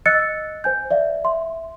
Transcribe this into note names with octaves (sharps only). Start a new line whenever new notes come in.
D#5 E6 F#6 A6 C#7
C5 G#5 G6
D5 E5 F5
E5 C6